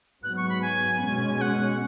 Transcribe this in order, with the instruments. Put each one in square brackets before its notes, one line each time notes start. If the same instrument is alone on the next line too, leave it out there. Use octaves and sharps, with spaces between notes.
[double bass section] G#2 F#3 B3 [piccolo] F#6
[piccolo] C#6
B5
G#5
[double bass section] B2 G#3 C#4
[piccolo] G#5
F#5